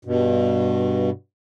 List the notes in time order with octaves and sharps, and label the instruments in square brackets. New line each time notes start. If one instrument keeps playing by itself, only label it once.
[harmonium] G2 B2